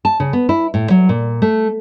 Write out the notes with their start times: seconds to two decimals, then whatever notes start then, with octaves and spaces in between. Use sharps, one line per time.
0.05 A5
0.20 C#3
0.33 B3
0.49 E4
0.74 A2
0.90 F#3
1.09 A#2
1.42 A3